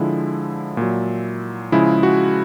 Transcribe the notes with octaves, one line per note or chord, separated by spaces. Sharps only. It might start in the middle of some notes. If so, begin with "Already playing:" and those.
Already playing: D3 F3 G#3 E4
A#2 F#3
C#3 F3 G#3 E4
F#4